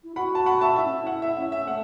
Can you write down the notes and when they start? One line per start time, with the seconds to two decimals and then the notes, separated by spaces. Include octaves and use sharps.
0.04 E4
0.16 F#4 F#5 B5
0.35 A5
0.46 F#5 B5
0.61 E5 A5
0.76 E4 E5
0.85 C#4
0.94 E4
1.07 F#5
1.22 E5
1.37 C#4 E5
1.52 E5
1.67 A3 F#5